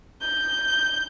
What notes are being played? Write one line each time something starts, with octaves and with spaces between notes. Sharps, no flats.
G6